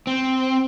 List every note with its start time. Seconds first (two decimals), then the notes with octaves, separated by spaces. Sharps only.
0.07 C4